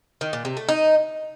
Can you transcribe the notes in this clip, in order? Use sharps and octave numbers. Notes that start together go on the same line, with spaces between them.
D#3
A#2
C3
A3
D#4